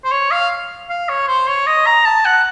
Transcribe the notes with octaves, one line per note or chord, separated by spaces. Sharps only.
C5
C#5
F5
F5
C#5
C5
C#5
D#5
A#5
A5
F#5